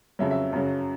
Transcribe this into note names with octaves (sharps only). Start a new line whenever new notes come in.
F2 C#3 F#3 E5
E5
F#2 C#3 F#3